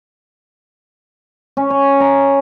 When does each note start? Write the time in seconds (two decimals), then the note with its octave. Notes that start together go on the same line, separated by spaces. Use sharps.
1.57 C#4
1.70 C#5
2.01 A#5